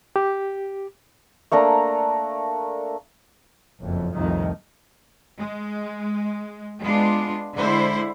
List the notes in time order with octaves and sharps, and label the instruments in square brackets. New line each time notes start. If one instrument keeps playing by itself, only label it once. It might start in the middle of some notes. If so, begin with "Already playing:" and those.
[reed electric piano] G4
[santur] A3 A#3 D4 A#5
[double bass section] F#1 F2
C2 F2 A2 D#3
[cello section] G#3
G#3 B3 D4 F4
D3 G#3 E4 C5